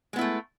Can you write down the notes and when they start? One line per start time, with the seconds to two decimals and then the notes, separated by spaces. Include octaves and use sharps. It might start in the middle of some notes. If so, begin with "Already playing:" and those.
0.13 G#3
0.16 B3
0.18 E4
0.21 A3